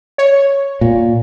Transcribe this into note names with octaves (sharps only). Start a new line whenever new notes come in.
C#5
A#2